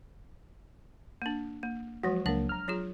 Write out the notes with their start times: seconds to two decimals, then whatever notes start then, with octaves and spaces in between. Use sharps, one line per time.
1.22 A#3 D4
1.63 A#3
2.03 F3 F#3 G#3 F#4
2.26 C#2 F#3 A#3 D4 F#5
2.49 A#5 F6
2.68 F#3 F4 G#4